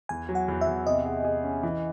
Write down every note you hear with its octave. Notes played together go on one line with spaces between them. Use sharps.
E2 G#5
F#3
F#5
E2
E5
E2
C3 D#5
G#4
G#4
C#4
E3